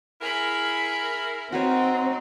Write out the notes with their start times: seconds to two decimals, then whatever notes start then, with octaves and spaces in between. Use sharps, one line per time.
0.21 E4 G#4 A#4 B5
1.52 C4 D#4 F#4 B4 C#5